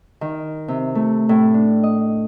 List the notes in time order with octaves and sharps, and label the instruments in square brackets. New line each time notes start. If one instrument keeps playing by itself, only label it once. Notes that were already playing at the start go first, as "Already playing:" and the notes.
[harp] D#3
C3
A3
A2
D4
D#5